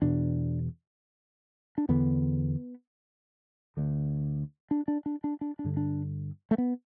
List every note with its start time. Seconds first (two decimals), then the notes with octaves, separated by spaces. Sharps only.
0.02 E2 B2 D4
1.78 D4
1.89 E2 D3 B3
3.77 D2 D3
4.71 D4
4.88 D4
5.06 D4
5.24 D4
5.41 D4
5.59 D4
5.64 G2 D3
5.77 D4
6.51 A3
6.58 B3